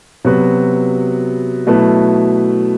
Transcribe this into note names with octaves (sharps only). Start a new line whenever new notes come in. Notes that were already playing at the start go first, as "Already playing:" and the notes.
C3 F#3 B3 F#4 B4
B2 F#3 A3 E4 B4